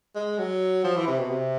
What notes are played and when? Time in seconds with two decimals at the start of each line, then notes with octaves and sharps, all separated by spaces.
0.16 G#3
0.38 F#3
0.84 F3
0.96 E3
1.07 C3
1.19 B2
1.30 C3